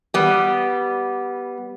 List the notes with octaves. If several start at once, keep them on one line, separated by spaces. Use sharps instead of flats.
G3 B3